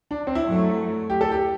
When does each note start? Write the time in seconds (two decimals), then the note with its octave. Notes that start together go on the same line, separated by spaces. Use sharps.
0.11 D4
0.27 C4
0.35 E4
0.43 F#2 F#3 A3
1.10 G4
1.21 A4
1.32 G4